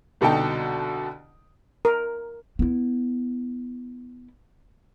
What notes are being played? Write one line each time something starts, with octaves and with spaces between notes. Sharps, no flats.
C2 B2 D3 D#4 G5 A5
A#4
B3 E4